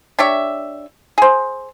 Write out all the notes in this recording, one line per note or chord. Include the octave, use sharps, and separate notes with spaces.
D4 G4 C#5 E5
G#4 C5